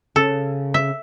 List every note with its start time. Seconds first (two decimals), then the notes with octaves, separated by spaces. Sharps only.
0.16 C#3 A4
0.74 E5